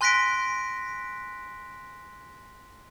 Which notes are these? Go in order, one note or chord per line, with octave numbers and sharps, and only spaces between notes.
G#5 C6 F#6 A#6 B6 D7